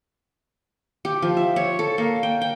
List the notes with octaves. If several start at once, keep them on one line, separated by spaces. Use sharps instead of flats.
G4
F3
E5
C#5
A4
A#3
G5
G5